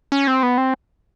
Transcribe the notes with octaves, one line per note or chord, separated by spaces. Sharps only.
C#4
C4
B3
C4